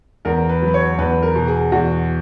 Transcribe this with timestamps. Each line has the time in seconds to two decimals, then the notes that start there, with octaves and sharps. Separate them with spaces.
0.25 E2 A#4
0.49 B4
0.62 F#3
0.68 B4
0.74 C#5
0.98 E2 B4
1.23 A#4
1.35 B2
1.48 G#4
1.72 E2 F#4